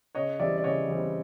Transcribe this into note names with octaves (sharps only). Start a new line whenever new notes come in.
C#3 C#5 D#5
E3 G3 C4 D5 E5
D5
C#3 C#5 D#5
E3 G3 C4